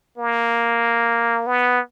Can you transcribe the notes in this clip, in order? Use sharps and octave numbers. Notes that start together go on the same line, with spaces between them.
A#3
B3